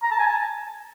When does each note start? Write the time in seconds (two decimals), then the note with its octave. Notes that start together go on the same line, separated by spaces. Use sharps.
0.03 A#5
0.11 A5
0.19 G#5
0.26 A5